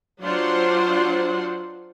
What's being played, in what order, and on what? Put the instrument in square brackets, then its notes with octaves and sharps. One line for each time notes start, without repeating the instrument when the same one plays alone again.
[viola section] F#3 D4 F4 C5 F#5 C6